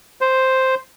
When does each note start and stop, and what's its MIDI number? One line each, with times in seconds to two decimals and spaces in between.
0.21 0.75 72